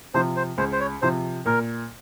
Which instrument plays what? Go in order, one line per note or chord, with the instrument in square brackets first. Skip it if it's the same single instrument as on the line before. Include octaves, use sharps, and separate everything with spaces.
[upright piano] C3 F3 [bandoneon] C5
[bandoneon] C5
[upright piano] C#2 [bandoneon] C5
[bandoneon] C5
C#5
[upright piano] C3 F3 [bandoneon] C5
[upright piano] A#2 [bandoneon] A#4